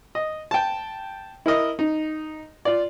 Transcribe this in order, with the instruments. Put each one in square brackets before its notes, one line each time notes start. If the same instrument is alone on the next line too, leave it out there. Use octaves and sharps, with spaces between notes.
[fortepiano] D#5
G5 A5
E4 A#4 D#5
D#4
F4 D5